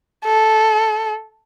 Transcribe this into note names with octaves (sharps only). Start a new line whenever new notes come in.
A4